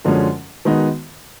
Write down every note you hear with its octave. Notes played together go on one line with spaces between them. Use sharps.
F#2 D3 F3 G#3 C#4
D#3 G#3 B3 D#4 F#4